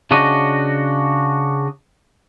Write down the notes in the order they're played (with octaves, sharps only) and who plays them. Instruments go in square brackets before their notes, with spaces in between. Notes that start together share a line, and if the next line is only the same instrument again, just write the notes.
[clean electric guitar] C#3 D4 F#4 D#5